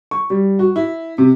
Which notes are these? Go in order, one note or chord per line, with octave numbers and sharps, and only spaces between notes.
C#6
G3
F#4
E4
C3